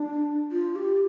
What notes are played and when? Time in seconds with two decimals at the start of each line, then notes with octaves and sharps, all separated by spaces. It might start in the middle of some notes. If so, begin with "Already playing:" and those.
Already playing: D4
0.51 F4
0.76 G4